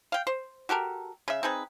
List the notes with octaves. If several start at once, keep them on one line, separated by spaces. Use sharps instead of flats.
F5 G5
C5
F#4 G4 A4 A#4
C#3 E5
C4 D#4 G#4 B4